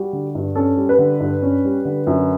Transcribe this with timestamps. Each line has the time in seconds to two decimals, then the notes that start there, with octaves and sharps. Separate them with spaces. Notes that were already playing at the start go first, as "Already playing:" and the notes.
Already playing: G3 F#4
0.13 D3
0.35 G2
0.55 C#4 A4
0.78 G3
0.89 B4
0.99 D3
1.20 G2
1.42 C#4
1.65 G3
1.85 D3
2.07 F#2